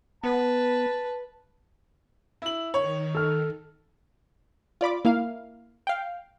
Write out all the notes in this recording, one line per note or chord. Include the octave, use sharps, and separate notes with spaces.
B3 B4 A5
E4 F#7
D#3 C#5
A4 F6
F4 D5 B5 D6
A#3 E4 F5
F5 G5